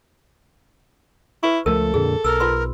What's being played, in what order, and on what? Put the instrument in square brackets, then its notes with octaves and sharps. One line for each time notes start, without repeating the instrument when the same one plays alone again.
[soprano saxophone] E4 [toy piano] B4 C#6
[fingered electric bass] C#2 F3 A3 [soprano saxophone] A4 [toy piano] A#4
[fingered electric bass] F2 A#2 D3 [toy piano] G#4
[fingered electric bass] B1 [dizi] A#4 [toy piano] E6
[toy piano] F4 B4 C6